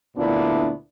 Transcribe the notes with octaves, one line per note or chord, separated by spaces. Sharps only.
D2 A#2 B3 D4 E4